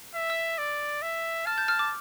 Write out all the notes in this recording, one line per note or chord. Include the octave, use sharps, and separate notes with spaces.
E5
E6
D5
E5
A5 F6
G6
F6
D6